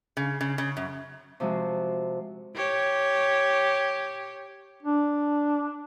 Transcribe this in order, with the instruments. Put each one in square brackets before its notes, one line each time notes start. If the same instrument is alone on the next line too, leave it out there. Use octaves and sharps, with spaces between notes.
[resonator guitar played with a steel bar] C#3
C#3
C#3
F#2
[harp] C3 F3 G#3 F#4
[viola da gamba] G4 C#5
[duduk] D4